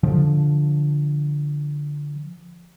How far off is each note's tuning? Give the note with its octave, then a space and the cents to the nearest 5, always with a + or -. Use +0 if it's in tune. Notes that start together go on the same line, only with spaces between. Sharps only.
D3 +0 F3 +0